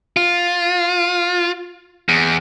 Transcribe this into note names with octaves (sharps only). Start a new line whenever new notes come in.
F4
E2